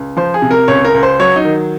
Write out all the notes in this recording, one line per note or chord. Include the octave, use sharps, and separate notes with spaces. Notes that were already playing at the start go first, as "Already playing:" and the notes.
Already playing: C#2
F3 C5
G#4
C3
A#4
C#2 C#5
A#4
C#2
C5
F#3 C#5
D#4
D#3